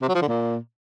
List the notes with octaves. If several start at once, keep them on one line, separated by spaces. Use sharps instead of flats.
C3
F#3
F3
D3
A#2